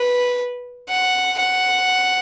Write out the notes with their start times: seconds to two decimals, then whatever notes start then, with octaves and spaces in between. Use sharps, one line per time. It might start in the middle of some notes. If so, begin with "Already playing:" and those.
Already playing: B4
0.89 F#5
1.39 F#5